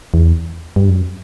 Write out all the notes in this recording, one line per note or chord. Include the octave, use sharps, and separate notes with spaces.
E2
G2
F#2